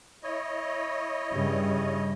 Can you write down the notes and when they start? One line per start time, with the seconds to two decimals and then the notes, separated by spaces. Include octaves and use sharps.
0.23 E4 C#5 D#5
1.32 G2 C#3 G3